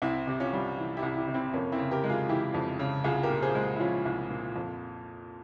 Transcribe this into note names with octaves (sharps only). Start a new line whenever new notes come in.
C2 C4 E4
C3 G4
C#4 F4
G3
E3
E4 G4
C2
E4 G4
C3
C4 E4
F2 A#3 C#4
C4 E4
C#3
G4 A#4
G#3
F4 G#4
E3 E4 G4
F2
C#3
C2 F4 G#4
G4 A#4
A#2
G#4 C5
G#3
E4
F3 C#4 F4
C2
A#2
F2